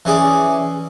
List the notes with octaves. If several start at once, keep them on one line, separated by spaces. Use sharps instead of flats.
E3 C#4 G#4 D5